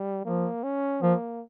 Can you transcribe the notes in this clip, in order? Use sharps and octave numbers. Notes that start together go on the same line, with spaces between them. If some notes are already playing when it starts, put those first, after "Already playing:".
Already playing: G3
F3 A#3
C#4
F3 A#3